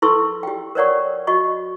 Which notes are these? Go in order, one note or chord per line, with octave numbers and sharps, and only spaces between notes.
E4 A4 B4 C6 C#6 E6
G4 G5
A#4 B4 C#5 D5 F#5 C#6
F#4 D#5 C#6